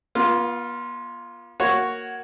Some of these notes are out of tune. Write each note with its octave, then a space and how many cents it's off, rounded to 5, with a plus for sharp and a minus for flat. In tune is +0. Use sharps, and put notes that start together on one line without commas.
B3 -45 F4 +0
A#3 +0 F#4 +5 C#5 +0